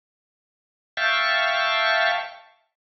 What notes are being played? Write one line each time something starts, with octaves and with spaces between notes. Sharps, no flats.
E5 F5 G5 A5 C#6